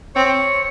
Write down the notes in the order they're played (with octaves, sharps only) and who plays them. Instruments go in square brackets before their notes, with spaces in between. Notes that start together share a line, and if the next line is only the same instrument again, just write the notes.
[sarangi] C4 [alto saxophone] C#5